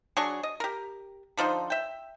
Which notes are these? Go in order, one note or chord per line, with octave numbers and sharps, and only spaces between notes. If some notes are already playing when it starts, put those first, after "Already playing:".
F#3 D4 G#4 C#6
D#5
G4 A#4
D3 F3 D#4 C5
E5 G5